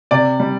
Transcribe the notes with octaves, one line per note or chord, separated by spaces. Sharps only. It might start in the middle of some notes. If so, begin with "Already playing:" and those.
C3 D5
G3